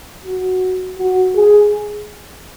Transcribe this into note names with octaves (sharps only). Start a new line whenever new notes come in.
F#4
F#4
G#4